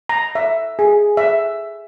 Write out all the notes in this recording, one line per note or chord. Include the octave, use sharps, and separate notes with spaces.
A#5
E5
G#4
E5